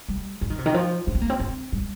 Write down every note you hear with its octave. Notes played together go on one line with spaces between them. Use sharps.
G3
F3
D#3
C3
D#3
F3
D#4
C4
A#3
C4
C4
G3